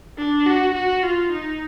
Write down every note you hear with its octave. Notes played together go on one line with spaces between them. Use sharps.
D4
F#4
F#4
F4
D#4